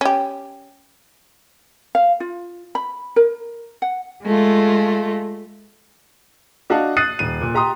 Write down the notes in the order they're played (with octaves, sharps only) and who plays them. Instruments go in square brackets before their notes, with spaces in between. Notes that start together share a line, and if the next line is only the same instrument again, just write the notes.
[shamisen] C#4 G4
[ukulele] F5
F4
B5
A#4
F#5
[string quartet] G#3 A3 F4
[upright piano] D4 F#4 D#5 F5 A5
D#6 F#6 A6 C7 D#7
D#1 D#7
A#2
G4 A#5 C6 D#6